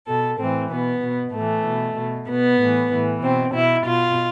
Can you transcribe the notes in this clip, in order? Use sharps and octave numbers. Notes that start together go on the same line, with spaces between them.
B2 A4
A2 E3 C4
B2 B3
B2
A2 E3 A3
B2
B2
B2 B3
A2 E3
A2 E3
B2 C4
B2 E4
B2 F4